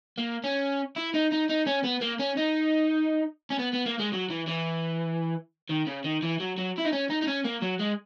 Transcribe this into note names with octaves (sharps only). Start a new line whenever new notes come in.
A#3
C#4
E4
D#4
D#4
D#4
C#4
B3
A#3
C#4
D#4
C#4
B3
B3
A#3
G#3
F#3
E3
E3
D#3
C#3
D#3
E3
F#3
F#3
E4
D#4
C#4
D#4
D#4
C#4
A#3
F#3
G#3